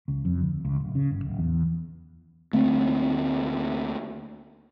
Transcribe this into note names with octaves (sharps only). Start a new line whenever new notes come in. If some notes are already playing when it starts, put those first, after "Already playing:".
C#2
F2
D2
C#2
D1
C#3
G1
D1
E2
D2 A3 A#3 C4